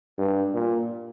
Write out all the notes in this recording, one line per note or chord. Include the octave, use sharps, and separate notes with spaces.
G2
A#2